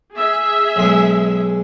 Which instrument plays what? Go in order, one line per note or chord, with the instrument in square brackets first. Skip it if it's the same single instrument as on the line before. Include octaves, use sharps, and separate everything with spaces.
[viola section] G#4 E5
[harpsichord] B1 G#3